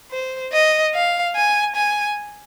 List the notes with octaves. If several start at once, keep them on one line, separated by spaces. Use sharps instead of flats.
C5
D#5
F5
G#5
G#5